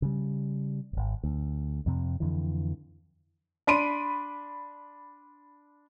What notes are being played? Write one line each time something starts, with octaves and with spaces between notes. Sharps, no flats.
C#3 G3
D#1 G#1
D2
F2 C3
F2 D3 E3
D4 B5 C6 D7 D#7